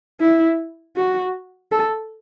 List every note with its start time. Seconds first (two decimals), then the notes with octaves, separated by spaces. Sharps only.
0.21 E4
0.96 F#4
1.72 A4